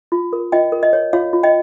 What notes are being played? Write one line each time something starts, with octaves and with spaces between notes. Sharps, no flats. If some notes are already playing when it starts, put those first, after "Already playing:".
F4
A#4
F4 D#5 G5
A#4
D#5
C#5
F4 C#5 F5
F4
D#5 G5